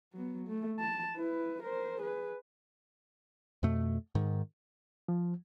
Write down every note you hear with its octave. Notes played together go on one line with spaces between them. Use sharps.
F#3 B3
A3
A5
E4 B4
A#4 C5
G#4 B4
F2 B2 A3
G#2 D#3
F3